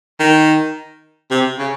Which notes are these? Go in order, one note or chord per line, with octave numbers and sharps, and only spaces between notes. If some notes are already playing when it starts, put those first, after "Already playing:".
D#3
C3
C#3